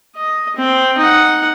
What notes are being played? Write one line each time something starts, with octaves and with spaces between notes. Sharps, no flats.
D#5
C4
D#4 F#5